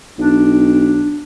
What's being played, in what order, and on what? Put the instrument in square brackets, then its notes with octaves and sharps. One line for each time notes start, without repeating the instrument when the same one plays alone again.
[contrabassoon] B1 [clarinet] D4